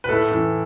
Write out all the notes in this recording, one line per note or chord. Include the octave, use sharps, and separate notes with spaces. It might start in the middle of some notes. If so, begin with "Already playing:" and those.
B4
A2 A4
E3